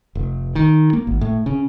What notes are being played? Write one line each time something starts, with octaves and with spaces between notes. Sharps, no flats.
F1
D#3
A#3
G#1
A2
C#3